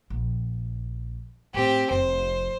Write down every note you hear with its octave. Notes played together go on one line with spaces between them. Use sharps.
A#1
A2 C4 G4
F1 C5